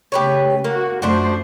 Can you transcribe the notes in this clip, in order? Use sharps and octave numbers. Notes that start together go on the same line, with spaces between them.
C#3 A3 G4 B4 C#5
A#3 F#4
F#2 F3 A3 D4 F#4 C5